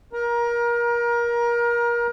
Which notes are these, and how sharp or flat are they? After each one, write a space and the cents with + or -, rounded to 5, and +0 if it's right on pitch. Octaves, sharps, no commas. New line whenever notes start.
A#4 +30 A#5 +20